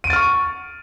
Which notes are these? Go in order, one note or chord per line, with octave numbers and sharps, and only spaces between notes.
C#6 F6 A6 D7 D#7